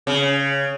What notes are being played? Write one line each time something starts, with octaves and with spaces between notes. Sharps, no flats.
C#3